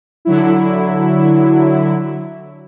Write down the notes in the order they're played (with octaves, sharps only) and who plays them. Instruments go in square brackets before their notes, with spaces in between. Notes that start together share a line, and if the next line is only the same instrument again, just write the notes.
[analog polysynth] D3 F#3 E4